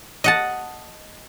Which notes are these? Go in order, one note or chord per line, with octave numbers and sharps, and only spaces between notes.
D#5 F#5 A5